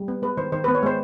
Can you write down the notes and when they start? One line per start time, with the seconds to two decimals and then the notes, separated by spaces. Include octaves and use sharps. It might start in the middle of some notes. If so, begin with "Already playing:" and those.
Already playing: G3
0.08 B3
0.22 G#3 B4
0.37 D#3 C5
0.52 D#3 C5
0.64 B3 B4
0.75 C#5
0.83 G#3 C5